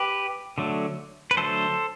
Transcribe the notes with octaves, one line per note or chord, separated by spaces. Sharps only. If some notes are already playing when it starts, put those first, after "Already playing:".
Already playing: G4 B4
D3 F#3 A3
B4
D3 F#3 A3 A4 C5